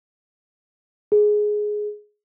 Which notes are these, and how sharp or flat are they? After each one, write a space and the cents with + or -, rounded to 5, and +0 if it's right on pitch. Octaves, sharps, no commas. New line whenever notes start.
G#4 +10